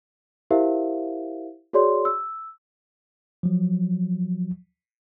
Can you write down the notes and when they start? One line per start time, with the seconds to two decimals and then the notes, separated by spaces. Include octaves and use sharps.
0.51 E4 G4 A#4 C5 E5 F5
1.73 F#4 G#4 C#5 D5 C6
2.05 E6
3.43 F3 F#3